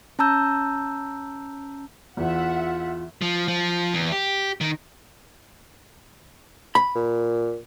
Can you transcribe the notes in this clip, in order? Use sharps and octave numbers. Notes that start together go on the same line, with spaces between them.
C#4 A5 A#5 E6 G6
E2 F4 E5 F#5
F3
F3
E2
G4
D#3
B5
A#2